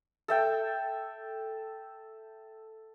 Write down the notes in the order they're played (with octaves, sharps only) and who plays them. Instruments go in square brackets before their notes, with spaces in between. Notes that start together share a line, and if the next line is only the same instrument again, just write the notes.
[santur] A4 E5 G5